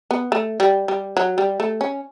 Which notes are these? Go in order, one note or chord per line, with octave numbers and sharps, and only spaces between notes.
B3
A3
G3
G3
F#3
G3
A3
C#4